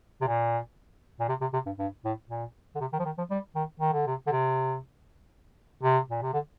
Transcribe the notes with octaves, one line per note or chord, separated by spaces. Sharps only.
C3
A#2
A#2
C3
C3
C3
G2
G2
A2
A#2
D3
C3
D#3
F3
D#3
F3
G3
D#3
D#3
D3
C3
D3
C3
C3
A#2
C3
D3